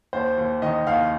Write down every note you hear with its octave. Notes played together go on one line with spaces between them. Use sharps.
D#2 C5
D#2
D#3 D#5
D#2 F5